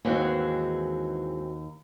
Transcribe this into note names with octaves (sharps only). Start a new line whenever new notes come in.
D#2 G#2 E3 G#3 C4 F#4